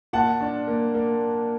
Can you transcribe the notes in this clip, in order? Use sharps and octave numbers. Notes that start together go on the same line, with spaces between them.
A#2 F#5 A5
D4
A#3
A#3